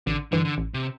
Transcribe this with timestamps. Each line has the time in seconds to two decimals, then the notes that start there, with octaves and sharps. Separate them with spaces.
0.07 A1 D3
0.32 G2 D3 E3
0.45 D3
0.58 A1
0.74 C3